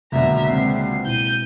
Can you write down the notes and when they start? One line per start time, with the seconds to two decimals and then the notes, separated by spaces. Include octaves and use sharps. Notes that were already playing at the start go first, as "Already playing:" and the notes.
0.12 C#2 B2 D3 F#3 A#3 E5 A#5
0.49 G#3 A#3 C4 C7
1.06 B2 E4 G6 D#7